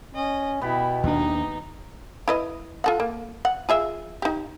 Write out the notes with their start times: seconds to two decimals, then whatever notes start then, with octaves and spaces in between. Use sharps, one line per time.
0.15 C#4 D#5
0.61 B2 B3 E4 G4
1.03 D#2 D4 D#4
2.28 E4 B4 D#5
2.84 F4 A4 F#5
3.00 A#3
3.45 F#5
3.69 F4 G#4 E5
4.22 D#4 G4